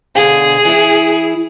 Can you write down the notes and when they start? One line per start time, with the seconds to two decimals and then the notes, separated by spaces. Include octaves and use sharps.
0.16 B2 D3 G#4 F5
0.65 E3 E4